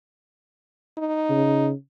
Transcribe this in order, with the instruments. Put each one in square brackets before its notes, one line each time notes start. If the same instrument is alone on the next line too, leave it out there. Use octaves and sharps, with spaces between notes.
[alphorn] D#4
[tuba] C#3